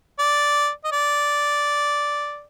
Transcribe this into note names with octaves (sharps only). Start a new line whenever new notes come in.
D5
D#5
D5